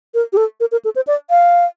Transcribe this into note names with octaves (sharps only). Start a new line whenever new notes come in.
A#4
G4
A4
A#4
A#4
A4
C5
D5
F5